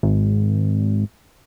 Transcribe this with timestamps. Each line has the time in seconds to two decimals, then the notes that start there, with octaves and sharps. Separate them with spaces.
0.03 G#1